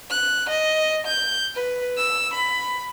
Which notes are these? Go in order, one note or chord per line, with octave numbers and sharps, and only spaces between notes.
F#6
D#5
G6
B4
E6
B5